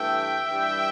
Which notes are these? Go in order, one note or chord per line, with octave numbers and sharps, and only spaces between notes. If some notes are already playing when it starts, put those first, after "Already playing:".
Already playing: G2 E3 A3 E5 G5
G2 E3 G3